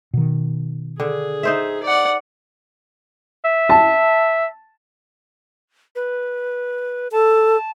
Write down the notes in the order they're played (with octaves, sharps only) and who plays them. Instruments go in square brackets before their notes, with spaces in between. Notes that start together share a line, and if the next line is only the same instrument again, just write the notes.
[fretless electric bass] B2 D#3
[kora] D3 [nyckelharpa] G#4
[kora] D#4 C5 E5
[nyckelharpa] D5 F#5
[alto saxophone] E5
[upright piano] A5
[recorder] B4
[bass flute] A4 [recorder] A5